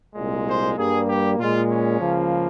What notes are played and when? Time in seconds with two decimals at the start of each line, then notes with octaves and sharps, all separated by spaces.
0.15 C2 A#2 G#3
0.47 C5
0.77 G2 G3 A#3 G#4
1.07 G4
1.38 A#2 G#3 F4
1.70 C#4
2.00 C#2 C#3 F3 A#3